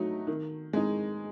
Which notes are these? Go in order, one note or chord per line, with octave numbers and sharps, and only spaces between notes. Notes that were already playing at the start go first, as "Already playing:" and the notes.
Already playing: F#3 A3 D#4
D#3
G#3 D#4